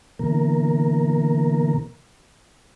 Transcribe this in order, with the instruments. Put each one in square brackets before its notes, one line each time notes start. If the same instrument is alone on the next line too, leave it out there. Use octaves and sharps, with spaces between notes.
[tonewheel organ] B2 D3 E3 A#3 A#4